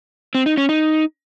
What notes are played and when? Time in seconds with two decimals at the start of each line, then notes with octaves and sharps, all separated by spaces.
0.35 C4
0.46 D#4
0.57 C#4
0.69 D#4